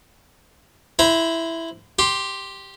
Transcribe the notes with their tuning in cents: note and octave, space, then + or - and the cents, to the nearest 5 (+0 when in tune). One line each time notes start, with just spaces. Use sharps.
E4 +0 C5 -20 A#5 +30
G4 +0 C6 +10